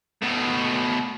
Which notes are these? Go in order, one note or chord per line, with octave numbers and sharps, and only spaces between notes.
B2 A3